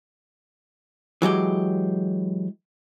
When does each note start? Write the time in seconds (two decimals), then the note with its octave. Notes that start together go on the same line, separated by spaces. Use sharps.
1.22 E3 F#3 G#3 G4